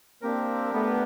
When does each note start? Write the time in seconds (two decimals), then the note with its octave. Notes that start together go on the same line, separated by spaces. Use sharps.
0.22 A#3 C4 D4 G4 A#4
0.72 A3 B3